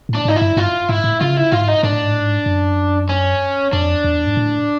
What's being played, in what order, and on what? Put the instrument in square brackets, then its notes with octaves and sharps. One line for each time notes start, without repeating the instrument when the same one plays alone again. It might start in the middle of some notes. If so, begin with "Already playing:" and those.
[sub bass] A2
[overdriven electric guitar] D4
[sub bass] G#2 [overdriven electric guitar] D#4
[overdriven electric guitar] E4
[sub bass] G2
[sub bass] G2 [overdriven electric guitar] F4
[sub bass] G#2 [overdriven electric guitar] E4
[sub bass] A2
[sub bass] C#3 [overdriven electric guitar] F4
[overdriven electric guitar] E4
[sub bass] G#2 [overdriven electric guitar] F4
[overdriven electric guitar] D#4
[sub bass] G#2 [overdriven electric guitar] D4
[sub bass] A2
G#2
A2
G#2
F#2
[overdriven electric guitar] C#4
[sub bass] F2 [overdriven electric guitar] D4
[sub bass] E2
G#2
A2